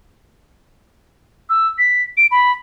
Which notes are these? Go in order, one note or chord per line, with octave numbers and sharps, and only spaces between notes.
E6
B6
D7
B5